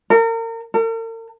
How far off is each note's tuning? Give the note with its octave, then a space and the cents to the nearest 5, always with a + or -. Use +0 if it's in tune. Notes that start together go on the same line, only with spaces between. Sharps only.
A#4 -35
A#4 -45